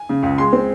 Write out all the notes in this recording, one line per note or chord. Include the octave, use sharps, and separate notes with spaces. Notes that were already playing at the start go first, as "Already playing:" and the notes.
Already playing: G#5
C#3
C#2
G#3 C6
C4